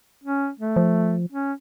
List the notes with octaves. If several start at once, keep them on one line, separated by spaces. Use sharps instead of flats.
C#4
A3
F3
C#4